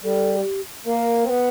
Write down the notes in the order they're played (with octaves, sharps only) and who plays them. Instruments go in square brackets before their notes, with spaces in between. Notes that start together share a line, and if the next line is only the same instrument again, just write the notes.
[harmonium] G3 [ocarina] A4
[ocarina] A4
G4
[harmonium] A#3 [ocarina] A#4
[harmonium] C4
[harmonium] B3 [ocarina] B4